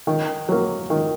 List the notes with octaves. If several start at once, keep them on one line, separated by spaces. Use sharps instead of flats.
D#3
F#3 A#3
D#3